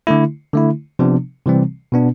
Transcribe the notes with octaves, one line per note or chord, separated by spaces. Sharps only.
D3 A3 E4
D3 A3 E4
C3 F3 B3 D4
C3 E3 G3 C4
B2 B3 D4